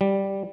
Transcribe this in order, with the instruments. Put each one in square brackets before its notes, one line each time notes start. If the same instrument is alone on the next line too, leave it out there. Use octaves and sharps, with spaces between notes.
[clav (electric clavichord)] G3